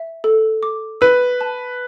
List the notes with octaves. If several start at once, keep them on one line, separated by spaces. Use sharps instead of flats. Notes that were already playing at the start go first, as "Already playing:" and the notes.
Already playing: E5
A4
D6
B4 E6
A5